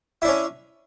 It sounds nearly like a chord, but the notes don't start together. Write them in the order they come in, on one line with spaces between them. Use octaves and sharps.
E4 D4 C#4